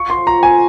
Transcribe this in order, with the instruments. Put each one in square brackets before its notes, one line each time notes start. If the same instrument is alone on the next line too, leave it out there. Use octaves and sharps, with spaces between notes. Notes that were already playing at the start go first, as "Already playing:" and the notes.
Already playing: [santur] F4 [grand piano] C#6
[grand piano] C6
[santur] F3
[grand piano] A#5
[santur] C4
[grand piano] G#5